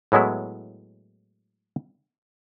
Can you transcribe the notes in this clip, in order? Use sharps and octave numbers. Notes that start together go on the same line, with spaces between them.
A2 F#3 G#3 B3 E4